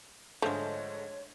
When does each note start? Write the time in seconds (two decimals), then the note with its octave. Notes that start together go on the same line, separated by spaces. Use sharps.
0.42 G#2 D3 F3 G#3 A3 C#5